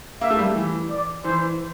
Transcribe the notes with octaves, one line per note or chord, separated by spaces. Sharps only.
A#3 E5
A3
G3
E3
D5
E3 C5